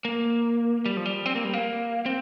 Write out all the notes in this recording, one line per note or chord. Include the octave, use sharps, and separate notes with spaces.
A#3
G3
F3
G3
C4
A#3
G3
A#3
C4